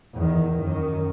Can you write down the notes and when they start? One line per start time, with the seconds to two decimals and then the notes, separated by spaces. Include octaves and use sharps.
0.14 E2 D#3
0.56 F#2 D#3